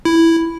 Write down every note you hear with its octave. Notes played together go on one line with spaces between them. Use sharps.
E4